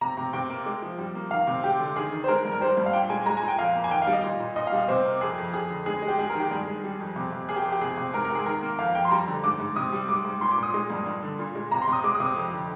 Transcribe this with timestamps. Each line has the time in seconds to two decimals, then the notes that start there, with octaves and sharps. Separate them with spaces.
0.01 C3 A#5
0.17 C3
0.33 C3 G5
0.50 A#3
0.66 G#3
0.82 F3
0.98 G3
1.15 A#3
1.31 D#3 F5
1.47 C3
1.63 G#3 G4
1.80 D3
1.96 D#3 G#4
2.12 D#3
2.24 C5
2.28 G#3 A#4
2.45 G2
2.52 A#4
2.61 G3 C5
2.77 G2
2.86 F5
2.93 A#2 G5
3.10 G#3 G#5
3.26 G#3 A#5
3.37 G#5
3.42 A#2
3.48 G5
3.58 F2 F5
3.75 A#3
3.84 G#5
3.91 D#3 G5
4.02 F5
4.07 G3
4.13 D#5
4.24 A#2
4.40 A#2
4.56 A#2 D#5
4.67 F5
4.72 G3
4.78 D#5
4.88 C3 C5
5.05 A#3
5.21 F2 G#4
5.38 F2
5.54 F2 G#4
5.70 D3
5.86 G#3 G#4
6.02 G#3
6.08 G4
6.19 G#2 G#4
6.29 A#4
6.35 D#3
6.40 G4
6.51 G2 G#4
6.67 G#3
6.83 G3
7.00 F2
7.16 C3
7.32 C3
7.49 A#3 G#4
7.56 G4
7.65 F2
7.72 G4
7.81 C3 G#4
7.97 C3
8.14 G#2 A#4
8.25 A#4
8.30 G#2
8.35 G#4
8.46 D#3 A#4
8.62 A#3
8.79 F2 F5
8.95 F2 G5
9.05 C6
9.11 G3 A#5
9.27 D3
9.44 G#2 D6
9.60 G#2
9.76 C3 D#6
9.92 G3
10.08 G#2 D6
10.25 G#2
10.41 A#2 C6
10.51 D6
10.58 A#2 D#6
10.74 G#3
10.90 G2
11.06 G2
11.23 D3
11.39 A#2
11.55 G#3
11.71 C3 A#5
11.82 C6
11.87 C3
11.93 D#6
12.04 G#3 D6
12.15 D#6
12.20 C3
12.25 D#6
12.36 F2
12.53 D3